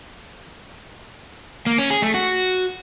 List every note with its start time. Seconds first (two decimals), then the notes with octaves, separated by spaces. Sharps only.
1.67 A#3
1.78 C#4
1.90 G#4
2.02 A3
2.14 F#4